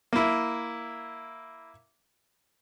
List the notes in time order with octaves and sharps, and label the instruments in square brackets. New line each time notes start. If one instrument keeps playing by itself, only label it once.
[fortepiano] A#3 E4